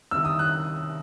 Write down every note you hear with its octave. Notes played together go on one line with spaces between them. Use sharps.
C2 C3 D#3 E6
D#6
F#6